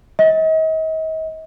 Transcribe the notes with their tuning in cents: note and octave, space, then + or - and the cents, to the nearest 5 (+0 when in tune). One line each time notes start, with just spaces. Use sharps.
D#5 +40